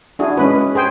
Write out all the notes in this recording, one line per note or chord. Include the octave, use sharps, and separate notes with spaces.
D4 E4 F#4 G#4
G#3 C#4 B4
G#4 C5 G5